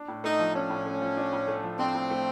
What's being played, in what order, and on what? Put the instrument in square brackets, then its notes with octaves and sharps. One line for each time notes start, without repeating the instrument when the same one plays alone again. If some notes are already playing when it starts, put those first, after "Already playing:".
Already playing: [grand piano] D4
A2
[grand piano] A3 [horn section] D#4
[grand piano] F3
[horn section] C#4 [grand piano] D4
[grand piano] A2
A3
F3
D4
A2
A3
F3
[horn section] C4 [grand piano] D4
[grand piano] A2
A3